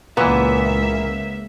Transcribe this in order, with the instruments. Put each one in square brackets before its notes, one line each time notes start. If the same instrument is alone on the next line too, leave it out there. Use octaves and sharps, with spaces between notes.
[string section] C#2 A#3 E5 [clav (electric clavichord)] A#2 E3 [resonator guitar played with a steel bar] B3